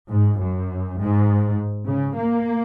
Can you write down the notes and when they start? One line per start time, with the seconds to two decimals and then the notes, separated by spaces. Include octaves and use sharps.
0.09 G#2
0.38 F#2
0.98 G#2
1.86 C#3
2.15 A#3